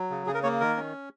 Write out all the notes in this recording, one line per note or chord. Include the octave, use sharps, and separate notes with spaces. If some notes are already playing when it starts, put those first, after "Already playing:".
Already playing: F#3
C#3
C#3 G#4
A#4
A#3 C#5
D#3 A#4
C#4